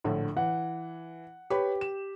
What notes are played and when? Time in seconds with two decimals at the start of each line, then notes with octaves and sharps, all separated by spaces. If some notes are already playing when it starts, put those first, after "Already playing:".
0.04 A#1 A2 D3
0.37 E3 F#5
1.50 G4 B4 C#5 B5
1.81 E7